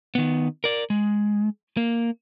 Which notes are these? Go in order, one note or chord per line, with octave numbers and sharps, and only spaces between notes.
D#3 B3
A#4 D5
G#3
A#3